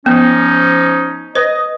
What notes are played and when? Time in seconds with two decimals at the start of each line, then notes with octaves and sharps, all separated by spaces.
0.06 F3 B3 C#4 D#4
1.35 B4 C5 D#5